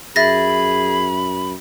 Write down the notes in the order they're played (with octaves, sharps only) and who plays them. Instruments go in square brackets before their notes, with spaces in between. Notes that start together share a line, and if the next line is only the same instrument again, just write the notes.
[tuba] F#2 [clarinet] G#4 [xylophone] E5 A6 A#6 [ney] B5